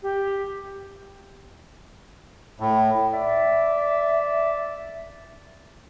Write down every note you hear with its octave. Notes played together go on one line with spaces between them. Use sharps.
G4
A2
D5 E5